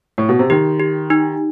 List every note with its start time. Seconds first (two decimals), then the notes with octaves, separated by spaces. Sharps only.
0.18 A2
0.29 B2
0.39 C3
0.50 D#3 G4
0.80 G4
1.10 D#4